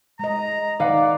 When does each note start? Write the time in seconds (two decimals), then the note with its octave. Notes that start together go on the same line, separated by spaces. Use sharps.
0.19 G#3 D#5 A#5
0.80 D#3 D#4 B4 D5 F5 F#5